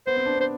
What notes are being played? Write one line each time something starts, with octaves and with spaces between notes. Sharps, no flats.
B3 C5
C4
D4
C4
C5